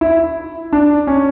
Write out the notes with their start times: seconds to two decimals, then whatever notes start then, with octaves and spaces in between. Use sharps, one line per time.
0.01 E4
0.73 D4
1.07 C#4